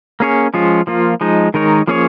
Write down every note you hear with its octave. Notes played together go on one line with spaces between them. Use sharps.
A#3 C#4 G#4 C#5
F3 G#3 C#4 F4
F3 A#3 F4
F3 G#3 D#4
D#3 G#3 D#4 A#4 C#5
F3 A#3 C#4 G#4 C#5